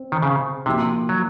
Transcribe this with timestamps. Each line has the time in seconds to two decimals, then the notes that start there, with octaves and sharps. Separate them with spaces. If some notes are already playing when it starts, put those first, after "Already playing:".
Already playing: C4
0.12 D#3
0.23 C#3
0.66 C3 F3 A#3 D#4 F#4
1.09 F#3